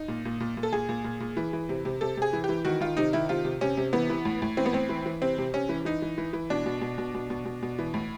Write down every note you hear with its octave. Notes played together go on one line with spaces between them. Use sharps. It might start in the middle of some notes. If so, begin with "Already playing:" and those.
Already playing: D#4
A#2
A#2
A#2
A#2
A4
A#2 G#4
A#2
A#2
A#2
E3
E3
C3
C3
C3 A4
C3 G#4
E3
G4
E3
D#3 F#4
D#3 F4
C3 D#4
D#3 E4
C3 F4
C3
C3 C#4
C3
E3 B3
E3
A2
A2
E3 C4
B3
A2 C4
E3
E3
C3 C4
C3
C3 C#4
E3
E3 D#4
E3
E3
E3
B2 D4
B2
B2
B2
B2
B2
B2
B2
E3
A2